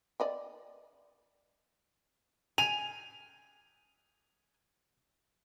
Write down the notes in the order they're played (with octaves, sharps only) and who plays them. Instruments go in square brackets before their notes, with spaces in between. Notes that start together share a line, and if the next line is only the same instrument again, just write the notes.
[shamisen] D5 D#5 G5
[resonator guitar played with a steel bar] G#5 [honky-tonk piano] F7